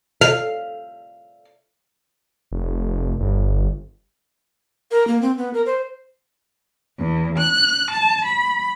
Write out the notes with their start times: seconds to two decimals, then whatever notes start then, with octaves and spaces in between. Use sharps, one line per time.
0.21 F5
2.52 F1
3.20 G1
4.91 A#4
5.08 A#3
5.22 C4
5.37 B3
5.54 A#4
5.66 C5
6.97 E2
7.38 F#6
7.90 A5
8.23 B5